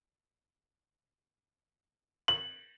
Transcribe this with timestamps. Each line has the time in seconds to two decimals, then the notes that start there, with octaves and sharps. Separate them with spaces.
2.28 F#7